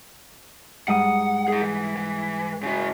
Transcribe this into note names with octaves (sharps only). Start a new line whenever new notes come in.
G#2 G3 F#5 D#6
G#4 F#5
E3
E3
C#3 F#4